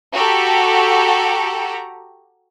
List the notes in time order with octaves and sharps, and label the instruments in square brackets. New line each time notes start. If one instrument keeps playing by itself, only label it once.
[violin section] F#4 G4 A4 A#5